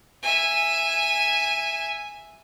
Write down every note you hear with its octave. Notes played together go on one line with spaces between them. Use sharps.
E5 G#5